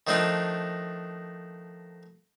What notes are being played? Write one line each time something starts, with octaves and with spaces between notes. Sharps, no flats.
D#3 F3 A3 D4 D#4 F4